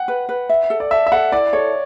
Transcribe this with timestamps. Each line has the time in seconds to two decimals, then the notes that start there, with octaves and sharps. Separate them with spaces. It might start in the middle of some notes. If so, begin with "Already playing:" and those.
Already playing: F#5 G5
0.08 B4
0.29 B4
0.49 E5
0.70 A4
0.80 D5
0.91 E5 A5
1.07 E5
1.12 A4 F#5
1.32 E4 D5
1.53 A4 C#5